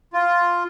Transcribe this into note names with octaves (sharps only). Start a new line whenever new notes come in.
F4